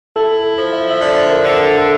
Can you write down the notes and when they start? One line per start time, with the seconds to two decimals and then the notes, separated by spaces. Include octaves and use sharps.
0.16 E4 A4
0.58 F3
0.73 E5
0.91 E5
1.01 D3 D5
1.30 A#4
1.44 D3
1.59 A4
1.78 A4